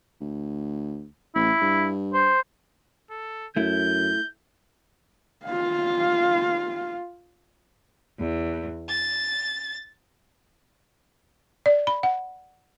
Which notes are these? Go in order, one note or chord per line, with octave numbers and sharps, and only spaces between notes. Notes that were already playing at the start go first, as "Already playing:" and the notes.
D2
A1 E4
G2
C5
A4
F#2 A3 E4 G6
F4 F5
E2
A6
D5
B5
F#5